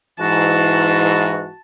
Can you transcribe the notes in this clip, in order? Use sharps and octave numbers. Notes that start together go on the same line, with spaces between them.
G#2 E3 F#4 A5